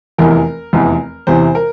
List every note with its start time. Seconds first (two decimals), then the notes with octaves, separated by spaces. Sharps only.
0.18 F1 E2 E3 A#4
0.73 F1 E2 E3
1.27 E2 C3 E3 C5
1.55 A#4